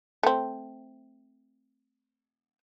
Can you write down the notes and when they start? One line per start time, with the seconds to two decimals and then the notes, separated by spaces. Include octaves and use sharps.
0.23 A3 C4